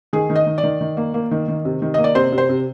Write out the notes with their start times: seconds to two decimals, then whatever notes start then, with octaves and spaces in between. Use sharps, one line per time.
0.13 D#3 G#4
0.30 D#3
0.36 D#5
0.46 D#3
0.58 D5
0.63 D#3
0.81 D#3
0.97 A#3
1.14 A#3
1.31 D#3
1.48 D#3
1.65 C3
1.82 D#3
1.94 A#3 D#5
2.04 D5
2.15 C3 C5
2.32 C3
2.38 C5
2.49 C3